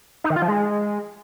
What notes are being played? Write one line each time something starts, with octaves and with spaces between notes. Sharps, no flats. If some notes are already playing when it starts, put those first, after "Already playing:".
D#4
D#3
F4
F3
G#3